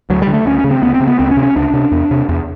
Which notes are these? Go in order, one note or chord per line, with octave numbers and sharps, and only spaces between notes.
D2 F#3
G3
D3
A3
D2 C#4
C#4
C#3
C4
D2 B3
C4
C#3
B3
C#2 C4
C#4
C3
C#4
C#2 D4
C3
E2
C3
E2